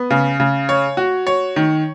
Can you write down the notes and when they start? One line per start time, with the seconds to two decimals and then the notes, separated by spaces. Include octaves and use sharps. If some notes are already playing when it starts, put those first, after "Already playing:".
Already playing: B3
0.11 C#3
0.40 C#3
0.69 C#5
0.97 F#4
1.27 C#5
1.56 D#3